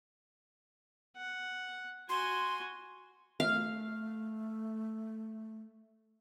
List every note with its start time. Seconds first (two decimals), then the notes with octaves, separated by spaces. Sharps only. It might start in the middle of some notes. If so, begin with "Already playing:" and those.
1.17 F#5
2.09 F#4 G#5 C6
3.40 A3 F5